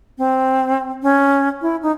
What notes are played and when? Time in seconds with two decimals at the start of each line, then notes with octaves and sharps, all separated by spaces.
0.18 C4
1.03 C#4
1.62 E4
1.82 D#4